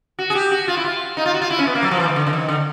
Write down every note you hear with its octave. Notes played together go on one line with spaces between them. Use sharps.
F#4
G#4
G4
F#4
F4
E4
F4
D#4
F4
F#4
F4
E4
C#4
B3
A#3
F#3
F3
E3
D#3
D3
D3
D#3
D3